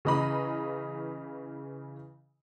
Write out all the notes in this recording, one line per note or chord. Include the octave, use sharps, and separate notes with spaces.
C#3 E3 D#5 A#5 B5